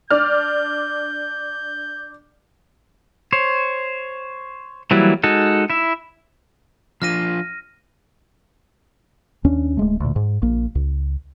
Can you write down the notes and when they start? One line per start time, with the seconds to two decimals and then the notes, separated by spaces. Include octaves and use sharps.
0.10 D4 D5 F6 G6
3.33 C5 C#5
4.91 E3 F#3 G3 A#3 E4
5.23 G#3 D#4 F#4 A4
5.70 E4 E5
7.02 F3 D4 F4 F6 A#6 D#7
9.44 D#2 C#4 D4
9.77 D1 G#3 A3
10.00 D2 A#2
10.16 G#2
10.42 A#1 A#3
10.75 C#2